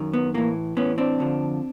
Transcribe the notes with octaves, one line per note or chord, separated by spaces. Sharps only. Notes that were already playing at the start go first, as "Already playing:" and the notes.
Already playing: F#2 D#3
B3
A2 E3 A#3
A2 E3 B3 C#4
C4 D4
F2 D3 F3